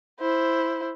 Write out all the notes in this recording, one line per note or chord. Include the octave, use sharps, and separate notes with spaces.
E4 C5